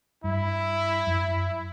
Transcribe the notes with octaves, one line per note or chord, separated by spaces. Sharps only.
G2 E4
F#2